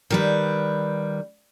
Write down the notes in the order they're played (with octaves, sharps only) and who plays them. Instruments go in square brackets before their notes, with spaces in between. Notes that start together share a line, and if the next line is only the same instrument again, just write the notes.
[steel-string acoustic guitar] D#3 G3 B4